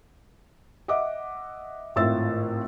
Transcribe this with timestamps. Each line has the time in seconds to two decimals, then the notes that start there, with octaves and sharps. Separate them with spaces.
0.88 D#5 E5 F#5 D6
1.96 G#1 A2 F4 E5 E6 A6